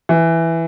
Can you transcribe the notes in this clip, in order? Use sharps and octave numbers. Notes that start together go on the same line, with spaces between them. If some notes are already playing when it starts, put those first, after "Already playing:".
E3